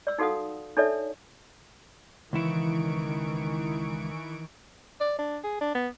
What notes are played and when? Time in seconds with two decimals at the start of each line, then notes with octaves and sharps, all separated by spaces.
0.07 D5 E6
0.19 D#4 F#4 A4 F5 F#5 D#6
0.77 D4 D#4 A4 C#5 D5 E5
2.33 C#2 D#3 E3 E4 C#6 D7
5.01 D5
5.19 D4
5.44 G#4
5.61 D4
5.75 B3